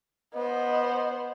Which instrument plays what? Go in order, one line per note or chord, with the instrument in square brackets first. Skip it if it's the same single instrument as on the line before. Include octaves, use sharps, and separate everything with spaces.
[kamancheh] B3 C5 [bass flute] D#5